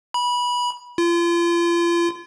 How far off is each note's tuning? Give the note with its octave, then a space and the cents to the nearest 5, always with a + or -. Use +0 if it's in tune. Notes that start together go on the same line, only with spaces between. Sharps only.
B5 -20
F4 -35